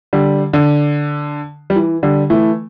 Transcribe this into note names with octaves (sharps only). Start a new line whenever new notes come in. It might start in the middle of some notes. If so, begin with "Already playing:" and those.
D3 G3
D3
G3
E3
D3 G3
E3 A3